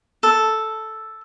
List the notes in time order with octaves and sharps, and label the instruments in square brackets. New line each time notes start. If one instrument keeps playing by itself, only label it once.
[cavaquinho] A4